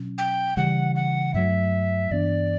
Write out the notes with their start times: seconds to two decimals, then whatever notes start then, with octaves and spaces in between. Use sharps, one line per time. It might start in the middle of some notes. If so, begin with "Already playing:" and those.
Already playing: B2 F#3 C#4
0.18 G5
0.57 C#3 E3 G3 F#5
0.96 F#5
1.34 G2 F#3 A3 E5
2.11 G2 E3 B3 D4 D5